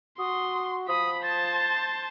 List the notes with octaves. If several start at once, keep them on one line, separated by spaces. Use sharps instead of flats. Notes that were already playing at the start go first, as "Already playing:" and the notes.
F#4 C6 D#6
F3 B5 D#6
C5 A5 A6